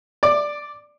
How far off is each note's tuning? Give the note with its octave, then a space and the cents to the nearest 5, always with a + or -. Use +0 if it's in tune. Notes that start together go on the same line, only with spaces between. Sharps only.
D5 +0 D6 +20